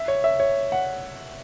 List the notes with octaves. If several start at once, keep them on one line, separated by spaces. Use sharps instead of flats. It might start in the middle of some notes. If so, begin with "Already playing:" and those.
Already playing: E5
C#5
E5
C#5
F#5